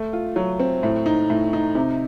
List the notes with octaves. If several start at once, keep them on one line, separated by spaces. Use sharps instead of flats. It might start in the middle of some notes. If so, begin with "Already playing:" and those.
Already playing: A3
F4
F#3
C4
A2
D#4
A2
D#4
C3